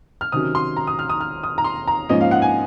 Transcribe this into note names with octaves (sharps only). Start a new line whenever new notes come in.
F6
C3 D#3 F#3 C#4 D#6
C6
A#5
D#6
F6
D#6
F6
D#6
A#5
C6
A#5
G#2 F3 A#3 C#4 D#5
F5
F#5
G#5